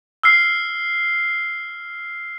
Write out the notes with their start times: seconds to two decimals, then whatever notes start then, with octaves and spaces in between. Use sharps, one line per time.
0.23 E6 F6 C7